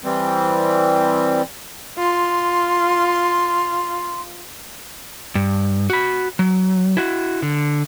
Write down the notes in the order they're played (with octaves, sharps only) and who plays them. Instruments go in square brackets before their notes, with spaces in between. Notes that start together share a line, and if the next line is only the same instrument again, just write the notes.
[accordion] E3 G3 C4
[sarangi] F4 [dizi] C6
[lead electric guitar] G2
F#4 B5
F#3
E4 F#4
D3